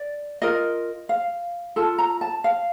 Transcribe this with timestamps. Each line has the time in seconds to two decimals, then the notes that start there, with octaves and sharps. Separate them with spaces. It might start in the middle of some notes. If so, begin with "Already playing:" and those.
Already playing: D5
0.42 F4 A#4 D#5
1.09 F5
1.76 F4 A4 A5
1.98 A#5
2.21 A5
2.44 F5